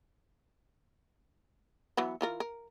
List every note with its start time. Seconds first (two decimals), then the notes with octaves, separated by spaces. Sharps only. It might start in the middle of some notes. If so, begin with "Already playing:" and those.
1.97 E3 F#3 B3
2.21 E3 F4 A#4
2.40 A#4